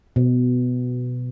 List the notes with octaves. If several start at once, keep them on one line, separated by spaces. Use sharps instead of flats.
B2